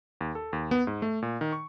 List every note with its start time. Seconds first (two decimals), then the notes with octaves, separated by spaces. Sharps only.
0.21 D#2
0.35 A4
0.53 D#2
0.71 B3
0.87 G#2
1.02 A3
1.22 A#2
1.41 D#3
1.52 C#6